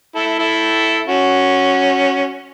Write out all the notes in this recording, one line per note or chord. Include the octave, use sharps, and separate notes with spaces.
E4 A4
E4 A4
C#4 F#4